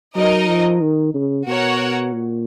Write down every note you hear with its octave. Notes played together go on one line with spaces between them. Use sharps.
F#3 D#4 A#4 D#5
F3
D#3
C#3
B2 F#4 A#4 C#5 F#5
A#2